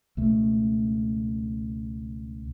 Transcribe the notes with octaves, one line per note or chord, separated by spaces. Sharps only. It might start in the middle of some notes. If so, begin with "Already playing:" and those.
C#2 B2 A3